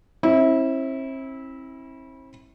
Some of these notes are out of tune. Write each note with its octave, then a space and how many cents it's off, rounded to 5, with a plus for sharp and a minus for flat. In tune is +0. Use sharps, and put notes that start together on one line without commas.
C4 +40 E4 -20